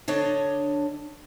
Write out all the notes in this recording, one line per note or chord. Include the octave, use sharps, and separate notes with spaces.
D3 D4 C#5 D#5